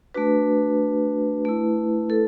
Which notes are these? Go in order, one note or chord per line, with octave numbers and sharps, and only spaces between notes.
A3 D4 F#4 B4
A3 E4
A4